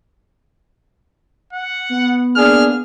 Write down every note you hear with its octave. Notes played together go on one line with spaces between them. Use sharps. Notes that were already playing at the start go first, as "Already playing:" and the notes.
F#5
B3
A#3 D4 G#4 F6